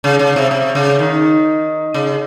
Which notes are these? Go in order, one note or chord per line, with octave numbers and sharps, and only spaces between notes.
C#3
C#3
C3
C3
C#3
D#3
C#3